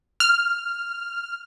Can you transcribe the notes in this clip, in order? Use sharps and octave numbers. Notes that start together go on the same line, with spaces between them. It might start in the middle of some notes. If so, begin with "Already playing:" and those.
F6